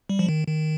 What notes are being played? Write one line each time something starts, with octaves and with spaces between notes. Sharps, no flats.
G3
F3
D#3
D#3